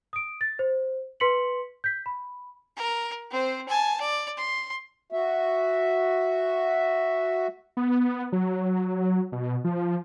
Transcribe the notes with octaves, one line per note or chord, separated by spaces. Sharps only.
D#6 D7
A6
C5
B4 C6 B6 C#7 F#7
G6 B6
B5
A#4
C4 C5
G#5 A5
D5
C6
F#4 E5
B3
F#3
B2
F3